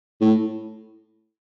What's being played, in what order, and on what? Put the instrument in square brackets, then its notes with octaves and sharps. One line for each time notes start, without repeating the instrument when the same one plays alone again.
[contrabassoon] A2